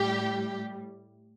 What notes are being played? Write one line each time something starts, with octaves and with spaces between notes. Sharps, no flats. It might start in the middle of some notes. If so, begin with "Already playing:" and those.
Already playing: A2 G3 G4